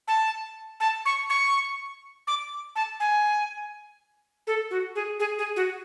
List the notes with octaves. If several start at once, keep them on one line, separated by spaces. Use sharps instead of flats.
A5
A5
C#6
C#6
D6
A5
G#5
A4
F#4
G#4
G#4
G#4
F#4